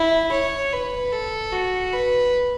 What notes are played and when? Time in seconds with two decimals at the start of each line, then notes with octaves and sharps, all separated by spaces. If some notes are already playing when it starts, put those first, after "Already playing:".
Already playing: E4
0.32 C#5
0.72 B4
1.12 A4
1.52 F#4
1.93 B4